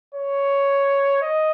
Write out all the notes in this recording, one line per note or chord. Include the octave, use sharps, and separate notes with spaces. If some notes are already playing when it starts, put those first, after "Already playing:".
C#5
D#5